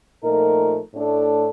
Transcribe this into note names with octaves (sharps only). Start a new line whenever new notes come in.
A#2 F3 A3 D#4 A#4
A2 A3 D4 A4